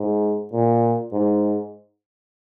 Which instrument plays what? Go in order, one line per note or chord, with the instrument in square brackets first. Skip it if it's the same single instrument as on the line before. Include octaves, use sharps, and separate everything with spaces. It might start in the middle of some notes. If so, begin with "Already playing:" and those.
Already playing: [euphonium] G#2
A#2
G#2